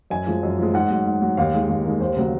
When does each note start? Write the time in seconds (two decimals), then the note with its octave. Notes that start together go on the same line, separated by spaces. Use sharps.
0.10 F#2 G#5
0.27 F3 G#3
0.43 F#2
0.58 F3 G#3
0.74 G#2 F#5
0.90 F#3
1.06 G#2
1.22 F#3
1.37 D#2 F5
1.53 D#3 G#3
1.69 D#2
1.85 D#3 G#3
2.00 D#2 C5
2.17 C#3 F#3